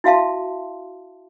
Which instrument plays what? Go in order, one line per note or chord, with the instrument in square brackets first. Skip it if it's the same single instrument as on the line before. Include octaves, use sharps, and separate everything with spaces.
[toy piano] E4 F#4 E5 F5 A5 C6